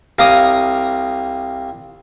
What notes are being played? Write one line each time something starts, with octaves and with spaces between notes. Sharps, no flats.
C2 F5 A#5 D6 D#6